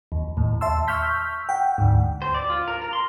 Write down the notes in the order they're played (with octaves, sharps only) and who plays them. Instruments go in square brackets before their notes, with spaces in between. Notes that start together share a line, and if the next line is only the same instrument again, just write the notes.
[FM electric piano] D#2
D#2 A2
E5 A5 C6 E6
C#6 E6 F6 G6 B6
F#5 G5
D2 G#2
[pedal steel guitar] C5
D5
F4
A#4
A#4
C6